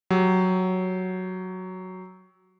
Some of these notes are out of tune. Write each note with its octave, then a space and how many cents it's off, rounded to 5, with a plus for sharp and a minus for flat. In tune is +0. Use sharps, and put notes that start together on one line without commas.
F#3 +0 G4 +0